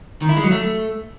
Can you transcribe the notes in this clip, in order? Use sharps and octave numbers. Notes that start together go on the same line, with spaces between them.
D#3
E4
G#3
F#3
A3